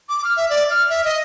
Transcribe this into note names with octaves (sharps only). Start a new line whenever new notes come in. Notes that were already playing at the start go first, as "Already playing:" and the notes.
D6
F6
E5
D5
F6
E5
D#5